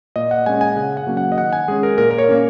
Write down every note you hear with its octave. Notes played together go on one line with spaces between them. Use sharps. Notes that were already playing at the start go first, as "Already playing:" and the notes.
A#2 D#5
F#5
G#3 C#4 G#5
G#5
C#3 F#5
F#5
F#3 A#3 C#4
F#5
D#5
D#3 F#5
G#5
G#3 C#4 G#4
A#4
A#2 A#4
A#4
C#5
A#3 C#4